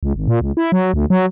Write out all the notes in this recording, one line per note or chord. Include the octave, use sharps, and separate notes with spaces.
C#2
G#1
A#2
C#2
E4
F#3
D2
F#3